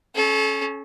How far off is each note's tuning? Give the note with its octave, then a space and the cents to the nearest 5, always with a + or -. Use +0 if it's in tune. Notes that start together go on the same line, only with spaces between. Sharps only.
C#4 +0 A4 -35